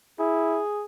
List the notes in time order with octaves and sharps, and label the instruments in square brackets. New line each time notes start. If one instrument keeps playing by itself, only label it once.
[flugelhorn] E4 [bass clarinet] G#4